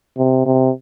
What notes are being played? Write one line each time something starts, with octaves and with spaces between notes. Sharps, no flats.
C3
C3